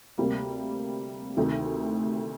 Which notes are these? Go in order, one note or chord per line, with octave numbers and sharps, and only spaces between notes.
D2 C3 G3 A#3
D2 C3 D#3 A3 D#4